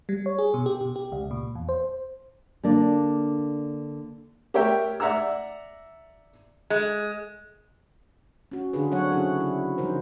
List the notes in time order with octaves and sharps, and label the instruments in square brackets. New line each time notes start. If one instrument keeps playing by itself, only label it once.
[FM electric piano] G3
C#5
G#4
B2
G4
B2
G4
C#2
A#2
E2
C5
[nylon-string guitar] D3 A#3 D4
[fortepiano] G4 A#4 C#5 E5 G5
D5 E5 F#5 A#5 E6
[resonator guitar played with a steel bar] G#3
[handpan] C#4 F#4
D3 D4 F4 G#4 B4
F#3 C4 C#5 F#5
C#3 C#4 E4 G#4
E4
C#3 F3 G3 D#4 A#4 C5